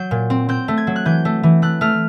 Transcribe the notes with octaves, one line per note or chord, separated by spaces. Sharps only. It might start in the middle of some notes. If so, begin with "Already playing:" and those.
Already playing: F#3 G6
A#2
C4
C4 G6
A3
G#6
F#3
F#6
E3 G6
A3
E3
A3 F#6
A3 F6